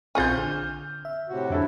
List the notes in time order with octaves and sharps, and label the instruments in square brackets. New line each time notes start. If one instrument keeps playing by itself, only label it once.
[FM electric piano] A#1 C4 C#6 [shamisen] F4 G#4 G#5 [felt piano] F6 G6
[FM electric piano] D3
E5
[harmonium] A2 C3 F#4
[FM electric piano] F2 [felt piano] D3 E4 A4